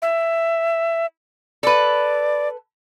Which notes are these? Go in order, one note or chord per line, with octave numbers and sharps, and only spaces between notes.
E5
A4 B4 D5